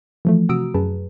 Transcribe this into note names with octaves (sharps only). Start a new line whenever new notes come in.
E3 F3 A3
C3 F#4 A#5 D#6 E6 D7
F#2 G#4 B4 A5